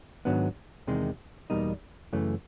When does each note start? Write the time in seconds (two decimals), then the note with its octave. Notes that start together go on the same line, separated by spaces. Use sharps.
0.25 G#2 D#3 F#3 B3 D4
0.87 E2 C3 D#3 G#3
1.50 E2 B2 G3 A#3 D#4
2.13 F#2 C#3 E3 A3